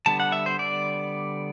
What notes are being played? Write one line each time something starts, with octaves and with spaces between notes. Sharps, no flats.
D3 G3 B3 A5
F#5
E5
C5
D5